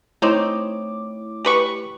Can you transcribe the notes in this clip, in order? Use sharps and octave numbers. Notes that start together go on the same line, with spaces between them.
A3 C4 D#4 E4 C#5 D6
G4 B4 C#6